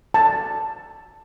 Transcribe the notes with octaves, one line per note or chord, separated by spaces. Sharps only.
A5